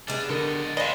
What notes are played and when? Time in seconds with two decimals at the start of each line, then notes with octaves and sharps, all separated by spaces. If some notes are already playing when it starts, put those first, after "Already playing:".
0.08 G3 G#3 B3 D4
0.30 D3 A4 A#4 D#5
0.77 G#3 B4 C5 D5 D#5 F5